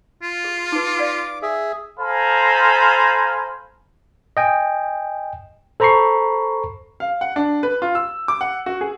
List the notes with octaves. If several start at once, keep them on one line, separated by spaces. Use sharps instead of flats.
F4
G#4
D#4 B4 D6
D5 F5
G#4 E5
A4 C5 F5 G#5 A#5 B5
D#5 G5 G#5
A4 C5 A#5 B5 C#6 C7
F5
F#5
D4
B4
F4
E6
D6
F#5
F#4
G#4